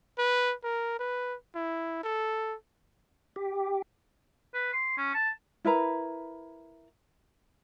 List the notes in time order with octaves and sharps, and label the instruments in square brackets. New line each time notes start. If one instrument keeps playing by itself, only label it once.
[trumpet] B4
A#4
B4
E4
A4
[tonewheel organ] G4
[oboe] B4
C6
C#4
A5
[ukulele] E4 A#4 B4 A#5